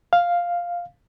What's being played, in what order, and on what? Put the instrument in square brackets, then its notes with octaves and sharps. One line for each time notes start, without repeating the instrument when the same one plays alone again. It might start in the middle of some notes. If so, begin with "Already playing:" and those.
[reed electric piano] F5